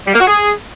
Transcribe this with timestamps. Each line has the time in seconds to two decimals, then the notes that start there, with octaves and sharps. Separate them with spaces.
0.07 G3
0.13 A#3
0.20 F#4
0.27 G#4